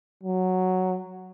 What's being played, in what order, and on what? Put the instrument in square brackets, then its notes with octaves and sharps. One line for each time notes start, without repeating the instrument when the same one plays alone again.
[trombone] F#3